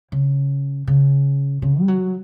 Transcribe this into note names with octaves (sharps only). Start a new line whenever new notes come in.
C#3
C#3
C#3
G3
F#3